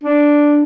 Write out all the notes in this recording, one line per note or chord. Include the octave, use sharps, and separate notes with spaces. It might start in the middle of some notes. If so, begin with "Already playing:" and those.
D4